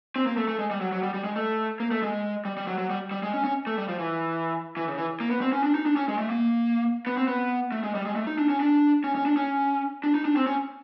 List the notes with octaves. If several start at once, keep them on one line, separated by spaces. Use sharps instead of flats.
C4
A#3
A3
A3
G#3
G3
F#3
F#3
G3
G3
G#3
A3
A#3
A3
G#3
G3
G3
F#3
F#3
G3
G3
G#3
C#4
C#4
A3
G3
F3
E3
E3
C#3
E3
A#3
B3
C4
C#4
D4
D#4
D4
C#4
G#3
A3
A#3
B3
C4
B3
A3
G#3
G3
G#3
A3
D#4
D4
C#4
D4
C#4
C#4
D4
C#4
D4
D#4
D4
C4
C#4